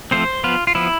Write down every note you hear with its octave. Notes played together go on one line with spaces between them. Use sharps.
F3 A3 C4 C5
F3 B3 F4
F4
F3 B3 E4